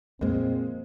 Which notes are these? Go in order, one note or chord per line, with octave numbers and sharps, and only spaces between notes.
F2 A#2 G#3 A#3 C4